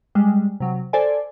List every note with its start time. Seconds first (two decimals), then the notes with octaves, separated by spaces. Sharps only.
0.15 G3 G#3
0.60 C3 F#3
0.93 A4 C5 D5 G#5